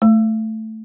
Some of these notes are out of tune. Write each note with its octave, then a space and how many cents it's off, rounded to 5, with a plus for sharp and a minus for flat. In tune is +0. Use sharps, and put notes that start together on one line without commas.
A3 +0